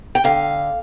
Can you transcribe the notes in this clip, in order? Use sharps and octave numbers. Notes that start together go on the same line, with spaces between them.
G5
D3 F5